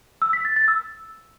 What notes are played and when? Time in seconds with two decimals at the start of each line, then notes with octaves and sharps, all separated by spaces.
0.22 E6
0.33 B6
0.45 A6
0.56 A6
0.68 E6